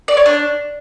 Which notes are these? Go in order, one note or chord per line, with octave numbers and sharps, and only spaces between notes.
D5
C#5
D4